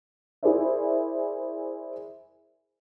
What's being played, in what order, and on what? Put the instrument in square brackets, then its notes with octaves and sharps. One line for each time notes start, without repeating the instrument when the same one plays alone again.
[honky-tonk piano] E4 G#4 A#4 C5 D5 E5